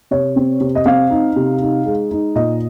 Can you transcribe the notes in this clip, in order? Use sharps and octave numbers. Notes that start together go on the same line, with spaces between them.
C3 C#5
C4
C3
D#5
C4 F5
D#4
C3
D#4
G#3
D#4
A#2 D#5